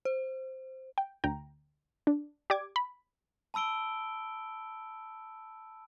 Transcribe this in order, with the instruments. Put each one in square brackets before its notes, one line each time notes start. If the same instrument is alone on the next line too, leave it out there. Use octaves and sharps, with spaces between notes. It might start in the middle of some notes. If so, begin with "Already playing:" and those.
[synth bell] C5
[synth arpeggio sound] G5
D2 G5 A#5
D4
G4 D5 D6 G#6
B5
[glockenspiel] A5 B5 E6 D7 G7